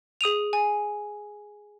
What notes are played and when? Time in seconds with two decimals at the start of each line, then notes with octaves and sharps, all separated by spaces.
0.21 G#4 D#6 D#7 F7
0.53 G#5